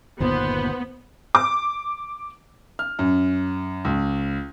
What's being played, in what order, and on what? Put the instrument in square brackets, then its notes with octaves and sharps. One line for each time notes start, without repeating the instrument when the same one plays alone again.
[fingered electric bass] G1 D#2 A#2 [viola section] B3 [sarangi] C5
[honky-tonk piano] D6
[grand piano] F6
F#2
C#2